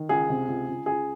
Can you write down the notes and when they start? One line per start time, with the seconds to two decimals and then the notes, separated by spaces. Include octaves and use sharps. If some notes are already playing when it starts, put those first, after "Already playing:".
Already playing: D#3
0.09 C#2 G#4
0.29 C3
0.48 C#2
0.68 C#2
0.86 C#2 G#4